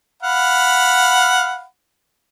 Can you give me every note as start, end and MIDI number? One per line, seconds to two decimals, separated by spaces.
0.23 1.64 77
0.23 1.64 78
0.23 1.64 83